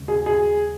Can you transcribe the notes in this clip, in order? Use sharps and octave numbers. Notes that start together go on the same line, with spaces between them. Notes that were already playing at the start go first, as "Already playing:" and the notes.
Already playing: D#2 C#3 G#3 C#4
G#4
G#4